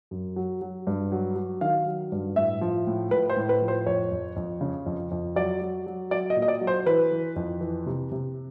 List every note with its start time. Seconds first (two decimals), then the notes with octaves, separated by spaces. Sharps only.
0.11 F#2
0.36 F#3
0.62 F#3
0.87 G2
1.12 F#3
1.36 F#3
1.61 D#3 F5
1.86 F#3
2.12 G2
2.36 A2 E5
2.61 F3
2.87 A2
3.11 A2 B4
3.29 C5
3.36 A2
3.49 B4
3.62 F3
3.68 C5
3.86 F2 C#5
4.11 F2
4.36 F2
4.61 C#3
4.86 F2
5.11 F2
5.36 F#3 D5
5.61 F#3
5.86 F#3
6.11 F#3 D5
6.30 D#5
6.37 A#2
6.42 D#5
6.48 D5
6.61 F#3
6.67 C5
6.86 E3 B4
7.12 E3
7.36 F2
7.61 E3
7.86 C3
8.12 C3